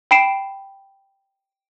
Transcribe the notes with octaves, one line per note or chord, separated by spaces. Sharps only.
G5 B5 C7 D7 E7